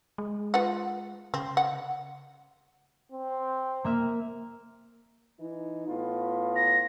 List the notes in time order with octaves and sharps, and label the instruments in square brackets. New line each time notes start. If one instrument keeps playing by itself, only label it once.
[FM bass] G#3
[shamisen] F4 B4 F#5
[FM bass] C#3 [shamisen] C4
[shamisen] F#5
[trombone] C4
[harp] A#3 E5 F6
[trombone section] E3 D#4
A2 B3 F4
[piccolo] A#6